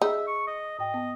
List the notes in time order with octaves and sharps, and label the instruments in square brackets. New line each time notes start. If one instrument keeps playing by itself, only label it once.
[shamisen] D#4 [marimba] G#4 [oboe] E5
[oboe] C#6
D#5
[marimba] G#2 G5 [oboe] D#5
[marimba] B3